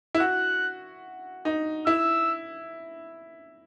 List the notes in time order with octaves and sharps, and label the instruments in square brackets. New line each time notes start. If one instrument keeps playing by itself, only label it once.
[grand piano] E4
[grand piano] F#4 [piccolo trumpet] F#6
[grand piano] D#4
[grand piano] E4 [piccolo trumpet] E6